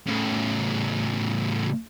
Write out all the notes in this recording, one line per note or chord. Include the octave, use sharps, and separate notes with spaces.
A2 C#3